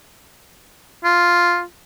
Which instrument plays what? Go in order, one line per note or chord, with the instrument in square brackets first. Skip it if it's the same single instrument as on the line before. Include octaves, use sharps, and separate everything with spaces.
[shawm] F4